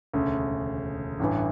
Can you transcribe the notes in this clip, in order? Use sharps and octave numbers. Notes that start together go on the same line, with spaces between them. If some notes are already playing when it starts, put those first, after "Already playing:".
E1 D2 C#3
A1 G2 E3